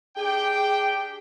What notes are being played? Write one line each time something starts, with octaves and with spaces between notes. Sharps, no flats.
D4 G4 G#4 G5